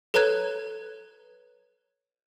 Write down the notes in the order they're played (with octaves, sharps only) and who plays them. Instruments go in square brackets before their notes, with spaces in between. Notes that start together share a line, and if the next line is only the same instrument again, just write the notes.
[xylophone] A4 B4 C#5 A#5 F#6 G#6